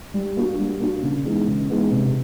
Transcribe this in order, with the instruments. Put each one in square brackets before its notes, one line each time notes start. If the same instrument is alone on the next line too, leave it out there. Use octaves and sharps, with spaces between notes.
[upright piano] G3
A#3 D4 F#4
G3
A#3 D4 F#4
C#3
E3 G#3 B3 D#4
C#3
E3 G#3 B3 D#4
C3